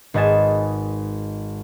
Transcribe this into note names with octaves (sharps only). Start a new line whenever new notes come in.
G#1 B4 D#5 G#5 A6 E7